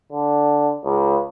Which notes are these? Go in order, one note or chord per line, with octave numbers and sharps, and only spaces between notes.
D3
C#2